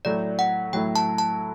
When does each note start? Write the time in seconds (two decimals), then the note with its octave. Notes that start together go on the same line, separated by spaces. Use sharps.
0.05 A2 F#3 A3 E4 D5
0.39 F#5
0.73 A2 F#3 A3 E4 G5
0.96 A5
1.18 A5